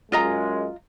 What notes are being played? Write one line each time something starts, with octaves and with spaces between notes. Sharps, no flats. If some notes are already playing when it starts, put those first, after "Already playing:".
F#2 G#3 F4 D#5 A#5